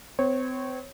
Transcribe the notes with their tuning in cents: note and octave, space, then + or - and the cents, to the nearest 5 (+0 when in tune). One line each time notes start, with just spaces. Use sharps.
C4 -35 C#5 -15